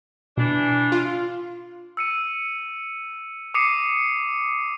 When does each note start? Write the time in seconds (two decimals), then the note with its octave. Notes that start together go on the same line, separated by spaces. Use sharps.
0.37 B2 E3 D4
0.92 F4
1.97 E6 C#7 D#7
3.54 D6 D#6 C7 C#7 D#7